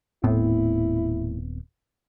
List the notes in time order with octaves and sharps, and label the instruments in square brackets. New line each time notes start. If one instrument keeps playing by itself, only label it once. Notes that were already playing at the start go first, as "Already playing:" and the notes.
[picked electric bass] D#1 B3 C4 [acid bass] A2 [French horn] E4